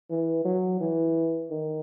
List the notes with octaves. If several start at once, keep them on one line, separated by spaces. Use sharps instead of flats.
E3
F#3
E3
D#3